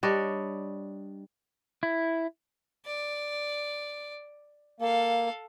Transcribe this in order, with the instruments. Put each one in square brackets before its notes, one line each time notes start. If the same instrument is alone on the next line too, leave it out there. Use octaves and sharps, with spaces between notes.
[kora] G3 D4 C#5 D#5
[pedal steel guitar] E4
[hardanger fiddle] D5
[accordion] A#3 [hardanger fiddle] A4 F5